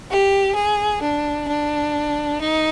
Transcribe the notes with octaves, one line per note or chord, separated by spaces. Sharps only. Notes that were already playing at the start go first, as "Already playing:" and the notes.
G4
G#4
D4
D4
D#4